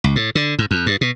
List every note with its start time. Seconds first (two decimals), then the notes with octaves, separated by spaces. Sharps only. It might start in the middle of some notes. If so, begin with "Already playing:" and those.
0.04 C#2
0.16 A2
0.35 D3
0.59 G#2
0.71 F2
0.86 G2
1.01 B2